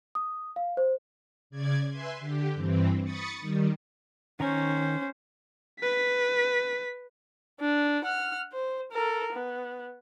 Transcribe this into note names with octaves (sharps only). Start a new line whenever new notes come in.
D#6
F5
C5
C#3 D5 G#6
B4 E5 G#5 C6
D3 G4
G2 E3 C4
B5 C#6 D#6 A6 C#7
D#3 G3
D#3 C#4 C5 A#5 C#6
B4 B6
D4
F#5 F6
C5
A4 A#4
B3